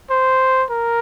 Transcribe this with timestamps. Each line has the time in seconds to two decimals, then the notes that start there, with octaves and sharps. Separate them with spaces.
0.10 C5
0.70 A#4